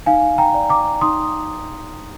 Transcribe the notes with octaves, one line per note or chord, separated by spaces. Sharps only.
D#4 F5 G#5
G5 A#5
D5
A#5 D6
D#4 C6 D#6